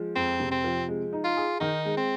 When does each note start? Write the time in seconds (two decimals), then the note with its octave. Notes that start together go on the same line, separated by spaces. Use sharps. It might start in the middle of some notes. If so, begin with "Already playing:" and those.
Already playing: F3 G#3
0.16 F2 C4
0.40 C3
0.52 C4
0.64 F3
0.88 G#3
1.13 D#4
1.24 F4
1.37 G#4
1.60 D#3 D#4
1.85 G#3
1.98 C4